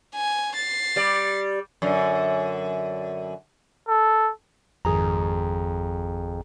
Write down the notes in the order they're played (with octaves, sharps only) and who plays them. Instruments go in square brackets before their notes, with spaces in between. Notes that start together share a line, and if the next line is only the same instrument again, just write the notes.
[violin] G#5
A6 C7
[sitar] G3 D5
F#2 D3
[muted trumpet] A4
[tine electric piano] G#1 G#4 A#5 [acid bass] F2